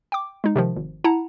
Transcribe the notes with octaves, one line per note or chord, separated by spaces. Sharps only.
G5 D6
G#3 D#4
C3 D#3 F3
G#1
E4 F#5 A5 A#5